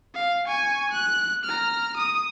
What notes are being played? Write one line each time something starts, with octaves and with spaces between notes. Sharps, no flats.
F5
G#5 C#6
F#6
A#5 F6
D#6